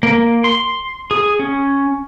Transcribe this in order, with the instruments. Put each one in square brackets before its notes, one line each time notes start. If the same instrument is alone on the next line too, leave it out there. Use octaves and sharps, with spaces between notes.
[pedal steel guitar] A#3
C6
G#4
C#4